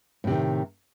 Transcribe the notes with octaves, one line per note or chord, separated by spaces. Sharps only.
A2 C3 D#3